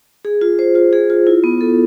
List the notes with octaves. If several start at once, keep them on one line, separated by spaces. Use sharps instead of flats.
G#4
F4
C5
F4
G#4
F4
E4
B3
A4